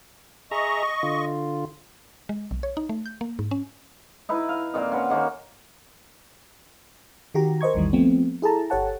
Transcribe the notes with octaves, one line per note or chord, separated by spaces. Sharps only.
G#4 D#5 E5 A#5 C#6
D3 F4
G#3
B1
C#5
D#4
A3
G6
A#3
G#2
C#4
D#4 E4 B4
F5
A#2 A#3 C4 D#4
C#4 F#4 B4
D#3 A#3 C#4 C5
D#3 F#4 G4 A#5
A#4 C5 D#5 C#6 G#6
A#1 E2 D#3 E3 G3
F3 A3 B3 C4
E4 G#4 A4 A5 A#5
G1 G4 A4 C#5 F#5 A5